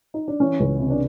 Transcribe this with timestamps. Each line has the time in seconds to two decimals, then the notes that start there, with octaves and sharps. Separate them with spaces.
0.14 D#4
0.28 D4
0.40 E3 C#4
0.60 C#2
0.79 C3
0.90 D4